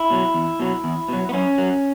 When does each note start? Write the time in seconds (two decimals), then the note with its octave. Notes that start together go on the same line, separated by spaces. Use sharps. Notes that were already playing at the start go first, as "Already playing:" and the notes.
Already playing: E4
0.10 B2 F#3
0.34 E2
0.60 B2 F#3
0.84 E2
1.09 B2 F#3
1.29 B3
1.33 F#2 C#4
1.58 F#3